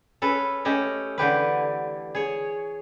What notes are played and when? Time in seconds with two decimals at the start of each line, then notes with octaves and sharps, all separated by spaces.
0.22 C#4 A4 B4
0.65 A3 C#4 G4 D#5
1.18 D3 E3 G4 B4
2.15 G#4 C#5